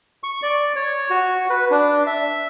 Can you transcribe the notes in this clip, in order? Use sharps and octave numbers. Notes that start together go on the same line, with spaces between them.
C#6
D5
C#5
F#4
B4
D4
E5